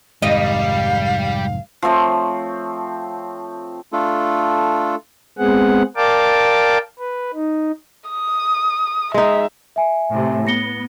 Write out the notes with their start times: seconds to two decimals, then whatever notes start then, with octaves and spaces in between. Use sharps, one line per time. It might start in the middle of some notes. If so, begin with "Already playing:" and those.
0.22 F1 G#2 D#3 G3 G4 D#5 F5
1.82 F3 A3 C4 C#5
3.93 A3 D4 F4 A4
5.38 G#3 B3 C4 G#4 F#5
5.96 A#4 D5 F5 G5 A5 D6
6.99 B4
7.34 D#4
8.10 D#6
9.14 G#3 D#4 E5
9.76 E5 G#5
10.10 A2 C3
10.47 B3 A#6 C#7 G7